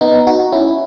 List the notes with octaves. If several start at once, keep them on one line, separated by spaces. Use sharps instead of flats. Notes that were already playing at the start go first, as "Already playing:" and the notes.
B3 D#4
D#4 F#4
C#4 E4